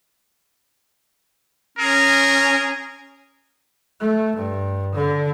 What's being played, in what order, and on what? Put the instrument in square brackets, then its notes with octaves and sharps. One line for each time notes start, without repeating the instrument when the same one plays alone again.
[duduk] C#4 [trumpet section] G#4 A#4
[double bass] A3
G2
D3